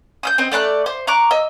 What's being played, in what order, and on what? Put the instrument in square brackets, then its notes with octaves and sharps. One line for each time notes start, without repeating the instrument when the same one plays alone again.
[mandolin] D#6 E6 G6
C4 D#5
A3 D5 C6 F#6
C5
A#5 C#6 D6 F#6
D#5 E6